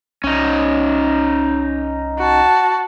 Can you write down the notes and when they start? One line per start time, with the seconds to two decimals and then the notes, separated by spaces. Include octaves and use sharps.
0.24 C2 C#4 D#4
2.19 F#4 A5